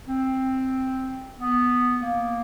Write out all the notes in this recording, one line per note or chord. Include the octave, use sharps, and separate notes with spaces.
C4
B3
A#3